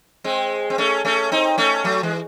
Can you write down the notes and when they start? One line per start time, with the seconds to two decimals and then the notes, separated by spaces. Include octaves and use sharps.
0.24 G#3 C4
0.70 C4
0.78 A3 C#4
1.05 A3 C#4
1.32 C4 D#4
1.58 A3 C#4
1.84 F#3 A3
2.03 E3 G#3